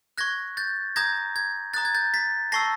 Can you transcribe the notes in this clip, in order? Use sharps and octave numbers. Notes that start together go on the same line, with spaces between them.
C#6 F#6 G#6 A#6
G6 A6
A#5 D#6 G6 G#6 A#6
G#6
A#5 D#6 F#6 A6
G#6
G6 A6
A6 B6
A5 C#6 E6 A#6 C7